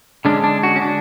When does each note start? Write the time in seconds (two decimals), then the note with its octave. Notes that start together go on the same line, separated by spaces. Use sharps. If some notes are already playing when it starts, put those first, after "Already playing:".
0.25 D3 G#3 C#4 D4
0.44 D4
0.63 F#4
0.76 C#4
0.82 D4